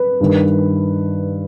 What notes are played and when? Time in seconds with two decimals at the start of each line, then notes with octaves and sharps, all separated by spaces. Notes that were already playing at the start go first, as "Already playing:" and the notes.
Already playing: B4
0.20 G2 D#3